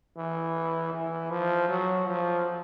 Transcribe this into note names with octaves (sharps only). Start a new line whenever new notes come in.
E3
E3
F3
F#3
F3